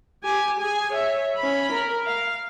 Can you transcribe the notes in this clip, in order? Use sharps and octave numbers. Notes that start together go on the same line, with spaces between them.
G4 G#5
G#4 G#5
C#5 E5
C#4 B5
A#4
F5